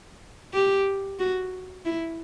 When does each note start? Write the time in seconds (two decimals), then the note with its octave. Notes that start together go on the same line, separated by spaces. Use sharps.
0.54 G4
1.20 F#4
1.85 E4